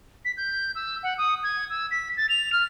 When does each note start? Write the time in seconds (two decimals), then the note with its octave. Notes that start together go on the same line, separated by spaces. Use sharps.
0.24 B6
0.36 G6
0.75 E6
1.03 F#5
1.17 D#6
1.43 G#6
1.69 E6
1.91 B6
2.17 A6
2.29 F7
2.52 F6